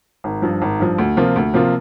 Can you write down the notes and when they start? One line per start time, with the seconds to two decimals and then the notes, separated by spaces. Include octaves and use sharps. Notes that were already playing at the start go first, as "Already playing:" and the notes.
0.24 G#1
0.42 G2 F3
0.62 G#1
0.80 G2 F3
0.98 D2
1.17 C3 F3 A#3 F4
1.36 D2
1.54 C3 F3 A#3 F4